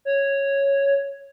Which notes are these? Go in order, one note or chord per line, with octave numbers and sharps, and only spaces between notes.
C#5